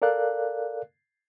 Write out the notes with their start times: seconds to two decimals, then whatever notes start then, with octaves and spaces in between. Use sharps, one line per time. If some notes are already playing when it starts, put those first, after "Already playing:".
0.02 A4 A#4 D5 F5 F#6